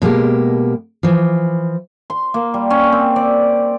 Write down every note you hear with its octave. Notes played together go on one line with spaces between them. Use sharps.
B2 G#3 A#3 G4
E3 F3
C6
A#3
G3
C#4
C4
D5